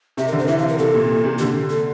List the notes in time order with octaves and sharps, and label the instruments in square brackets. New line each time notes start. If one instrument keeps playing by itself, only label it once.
[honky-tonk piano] C3 [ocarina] E5
[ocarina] A#4
[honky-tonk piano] D3
[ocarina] C5
[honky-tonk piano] E3 [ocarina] E5
[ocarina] F5
A#4
[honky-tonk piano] C3 [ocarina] A4
[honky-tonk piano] A#2
C3
[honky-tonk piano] D3 [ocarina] G4
[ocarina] A4